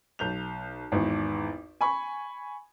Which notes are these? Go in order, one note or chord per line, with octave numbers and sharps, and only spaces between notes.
B1 G6 F7
G#1 E2
G#5 B5 C#6